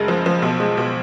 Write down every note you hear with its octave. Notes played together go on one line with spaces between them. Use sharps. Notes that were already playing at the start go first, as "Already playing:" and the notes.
Already playing: F#1 G#3
F3
F3
B1
G#3
B1